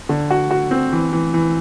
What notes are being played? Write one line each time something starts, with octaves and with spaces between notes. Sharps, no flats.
D3
F#4
F#4
C4
E3
E3
E3